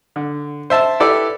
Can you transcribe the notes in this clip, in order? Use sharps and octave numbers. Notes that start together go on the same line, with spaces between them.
D3
C5 E5 A5
E4 G4 A4 B4 D5